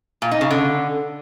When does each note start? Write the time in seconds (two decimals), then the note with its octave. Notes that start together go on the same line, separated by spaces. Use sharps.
0.22 A#2
0.31 D#4
0.41 C#3
0.51 D3